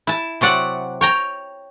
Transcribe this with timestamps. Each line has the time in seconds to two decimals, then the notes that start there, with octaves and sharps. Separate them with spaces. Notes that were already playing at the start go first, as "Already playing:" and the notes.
0.07 E4 A5
0.41 C3 F#3 D5 F#5
1.01 C#5 G5 A#5